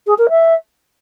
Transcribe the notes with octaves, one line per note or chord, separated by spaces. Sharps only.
G#4
A#4
E5